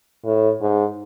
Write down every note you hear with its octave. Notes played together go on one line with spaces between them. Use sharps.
A2
G#2